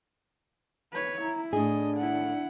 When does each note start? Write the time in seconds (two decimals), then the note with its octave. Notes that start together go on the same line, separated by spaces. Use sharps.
0.93 B4 C#5
1.22 E4 A#5
1.53 A2 D4 G#4 D#5
1.98 E4 F#5